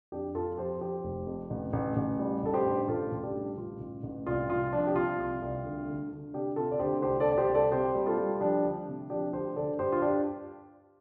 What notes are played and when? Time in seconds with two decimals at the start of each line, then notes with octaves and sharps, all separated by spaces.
0.12 F2 D4 G4
0.35 F2 F4 A4
0.57 F3 G4 C5
0.81 F3 G4 C5
1.04 F1
1.27 F2
1.50 A1
1.73 A1
1.96 A1
2.19 G3
2.43 A1 A4
2.54 G4 C5
2.66 G2
2.88 A1 F4 A4
3.12 A1
3.23 D4 G4
3.34 G3
3.57 A1 F4
3.80 A1
4.03 A1
4.26 C2 F4
4.49 C2 F4
4.73 F3 D4
4.87 G4
4.95 C3 F4
5.18 C2
5.42 C2
5.65 D2
5.88 D2
6.11 D2
6.34 C3 D4 G4
6.56 C3 F4 A4
6.71 D5
6.79 D2 G4 C5
7.02 C2 G4 C5
7.20 A4 D5
7.26 C2
7.31 D5
7.38 G4 C5
7.49 C2
7.54 A4 D5
7.72 C3 G4 C5
7.95 G3
8.06 F4 A4
8.18 G3
8.40 F3 D4 G4
8.64 D2
8.88 C3
9.10 F3 D4 G4
9.33 D2 G4 C5
9.56 D2 A4 D5
9.79 G2 G4 C5
9.92 F4
10.02 D4 G4